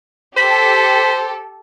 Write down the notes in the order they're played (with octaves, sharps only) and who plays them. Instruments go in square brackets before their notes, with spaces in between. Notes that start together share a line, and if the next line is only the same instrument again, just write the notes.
[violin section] G4 A4 [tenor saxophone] C5 [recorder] B6